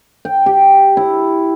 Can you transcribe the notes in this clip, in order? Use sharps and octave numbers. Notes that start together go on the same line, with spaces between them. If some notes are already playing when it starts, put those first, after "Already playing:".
G5
G4
E4